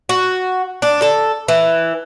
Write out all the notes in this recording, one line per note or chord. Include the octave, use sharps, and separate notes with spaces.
F#4
D4
A4
E3